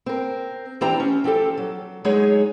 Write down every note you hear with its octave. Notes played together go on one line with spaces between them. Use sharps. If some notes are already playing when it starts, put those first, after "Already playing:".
C4 A#4
E3 C4 D4 G4 C5 A#5
C#4
F3 C4 G4 A4
F#3
F#3 G#3 D#4 G#4 C#5